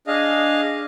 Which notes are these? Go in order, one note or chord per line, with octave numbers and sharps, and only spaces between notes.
D4 G#4 D#5 F5